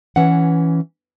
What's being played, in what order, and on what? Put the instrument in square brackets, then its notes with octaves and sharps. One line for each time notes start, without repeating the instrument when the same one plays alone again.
[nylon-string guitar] E3 C#4 F#5